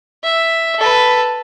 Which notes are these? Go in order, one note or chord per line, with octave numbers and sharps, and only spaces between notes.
E5
A4 B4